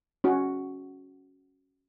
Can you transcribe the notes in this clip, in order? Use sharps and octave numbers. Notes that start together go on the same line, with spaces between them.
C#4 F#4